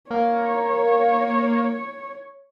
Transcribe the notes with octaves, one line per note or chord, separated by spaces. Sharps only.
A#3 C#5